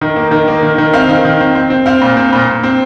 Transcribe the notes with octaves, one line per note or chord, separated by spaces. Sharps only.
D#3
A#3
D#3
A#3
D#3
D#3
C4 F5
D#3
D#3
C4
C4
C4
C4 F5
A#2
C4
A#2
A#2
C4